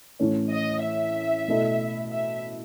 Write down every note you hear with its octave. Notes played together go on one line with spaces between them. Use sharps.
A2 E3 A3 C#4
D#5
E5
B2 A3 E4 A4 D#5
E5